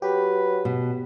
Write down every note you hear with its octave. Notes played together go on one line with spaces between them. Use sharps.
F#3 G4 B4
B2